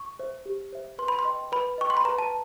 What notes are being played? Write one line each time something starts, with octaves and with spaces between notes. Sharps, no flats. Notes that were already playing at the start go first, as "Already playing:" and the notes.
Already playing: C#6
C5 E5
G4
C5 E5
B4 C6
B5
C6
D#5 G5
B4 B5
D#5 G5 C#6
C6
B5
B4 A#5
A5